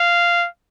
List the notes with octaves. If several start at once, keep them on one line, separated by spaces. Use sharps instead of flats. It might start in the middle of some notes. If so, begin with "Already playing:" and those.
Already playing: F5